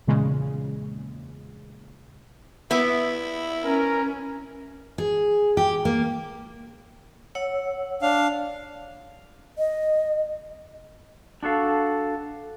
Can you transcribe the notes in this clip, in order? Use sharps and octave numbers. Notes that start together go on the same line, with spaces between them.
E2 A#2 C#3 G#3
B3 E4 E5 D6
C#4 A#4
G#4
G4
A#3
C#5 F#5 E6
D4 F5
D#5
D4 F#4 A4 F5